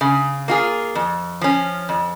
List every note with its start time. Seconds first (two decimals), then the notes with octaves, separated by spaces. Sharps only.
0.01 C#3
0.48 A#3 F4 G#4
0.95 F2
1.41 F3 C#4
1.89 F2